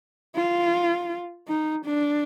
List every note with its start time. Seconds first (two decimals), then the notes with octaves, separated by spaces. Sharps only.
0.36 F4
1.48 D#4
1.85 D4